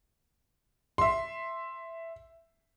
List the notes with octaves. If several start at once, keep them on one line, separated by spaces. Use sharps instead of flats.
E5 C6